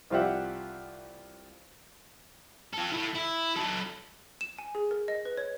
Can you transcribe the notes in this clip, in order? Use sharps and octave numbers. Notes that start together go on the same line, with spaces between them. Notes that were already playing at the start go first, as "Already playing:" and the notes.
C2 F3 F4 G4 E5 F#5
F4 A4
A3 E4
E4
F#3 A4
E7
G#5
G#4
A#4
D#5
B4
C#5